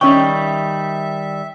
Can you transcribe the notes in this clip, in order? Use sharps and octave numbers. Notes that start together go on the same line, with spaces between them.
D#3 G3 C#4 C#5 E5 G5 C#6